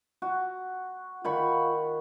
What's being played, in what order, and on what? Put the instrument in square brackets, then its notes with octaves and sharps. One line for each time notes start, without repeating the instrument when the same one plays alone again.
[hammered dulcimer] F#4
[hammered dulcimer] D#3 B5 C#6 [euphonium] F4